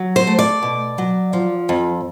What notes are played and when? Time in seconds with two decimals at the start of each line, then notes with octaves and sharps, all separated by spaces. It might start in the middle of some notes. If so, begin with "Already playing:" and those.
Already playing: F#3
0.16 C5
0.27 A3
0.39 D5
0.63 B2
0.98 F#3
1.33 F3
1.69 F2